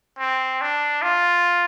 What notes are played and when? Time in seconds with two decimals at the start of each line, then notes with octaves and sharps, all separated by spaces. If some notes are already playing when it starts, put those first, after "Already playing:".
0.19 C4
0.61 D4
1.02 F4